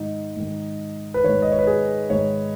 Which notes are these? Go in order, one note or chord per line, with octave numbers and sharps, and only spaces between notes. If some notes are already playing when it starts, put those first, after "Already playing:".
Already playing: G#2 D#3 D#4
G#2 D#3
B4
G#2 D#3 C#5
D#5
C#5
B4
G#4
G#2 D#3 C#5